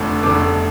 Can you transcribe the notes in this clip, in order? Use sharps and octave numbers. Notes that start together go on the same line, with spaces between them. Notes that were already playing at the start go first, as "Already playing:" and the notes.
Already playing: F1 F2 D3 A3
F1 F2 D3 A3 D6